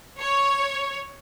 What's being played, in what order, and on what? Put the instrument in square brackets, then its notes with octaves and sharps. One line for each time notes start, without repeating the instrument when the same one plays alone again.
[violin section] C#5